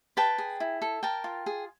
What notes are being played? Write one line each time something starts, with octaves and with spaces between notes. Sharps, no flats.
B4 G5 A5
G#4
E4
A4
A#4 G5 A5
F4
G#4